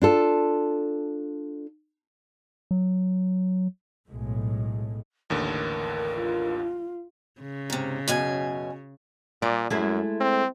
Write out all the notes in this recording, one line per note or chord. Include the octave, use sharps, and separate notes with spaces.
D4 F4 A4
F#3
B1 A2 G#3
A1 D#2 D3 A#4
F4
C#3
G#2 C3
F#2 B2 G#5
A#2 D5
F#2 G#3 A3 E4
C4